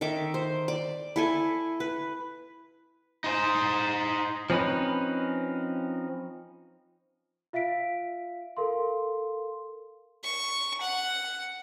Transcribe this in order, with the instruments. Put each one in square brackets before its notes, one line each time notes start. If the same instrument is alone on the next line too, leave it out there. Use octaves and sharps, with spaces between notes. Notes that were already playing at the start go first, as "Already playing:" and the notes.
[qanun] D#3 A4 E5 D6
C5
D5
E4 A4 G#5
B4
[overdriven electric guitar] D#4 C5
[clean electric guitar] F3 C4 C#4 D#4 B4
[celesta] F4 E5 F5 B6 D7
A4 A#4 F5 C6
[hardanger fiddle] C#6
F#5